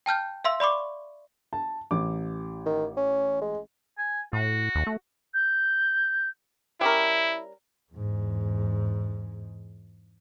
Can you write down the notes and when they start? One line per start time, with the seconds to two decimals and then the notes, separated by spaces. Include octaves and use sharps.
0.06 G5 A5 F6 G6
0.44 E5 F5 C6 E6
0.60 D5 B5 C#6 D6
1.53 A5
1.91 A1 D6
2.66 D#3
2.97 C#4
3.41 G#3
3.98 G#5
4.33 A2 F#4
4.75 D#2
4.87 A3
5.34 G6
6.81 G3 C#4 E4 A#4
7.93 E2 G#2